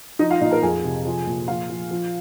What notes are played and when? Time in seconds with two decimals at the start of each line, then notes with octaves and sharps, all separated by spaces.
0.19 F3 D#4 D#5
0.31 F4 F5
0.41 A#2 D#4 D#5
0.51 A#4 A#5
0.62 F2 G#4 G#5
0.84 C3
1.05 F3
1.27 A#2
1.48 F3 F4 F5
1.69 F3
1.91 F3